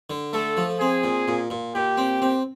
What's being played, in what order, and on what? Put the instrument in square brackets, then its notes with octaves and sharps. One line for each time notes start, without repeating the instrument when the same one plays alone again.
[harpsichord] D3
[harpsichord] A3 [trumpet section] A4
[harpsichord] F3
[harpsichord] C4 [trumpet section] G#4
[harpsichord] A#2
A#2
A#2
[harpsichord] A#2 [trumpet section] G4
[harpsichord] C4
C4